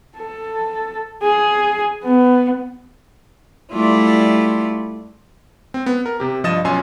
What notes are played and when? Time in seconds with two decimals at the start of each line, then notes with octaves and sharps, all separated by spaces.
0.18 A4
1.22 G#4
2.04 B3
3.72 G3 A3 E4 F4 D5
5.74 C4
5.86 B3
6.06 A#4
6.20 C3 G4
6.44 G2 F3 D#5 D#6 A6 E7
6.65 B1 C#4 F4 G#5 C6 E6